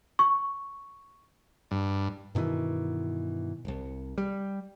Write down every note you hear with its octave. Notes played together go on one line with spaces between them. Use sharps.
C#6
G2
G2 B2 D#3 E3
D1 C2
G3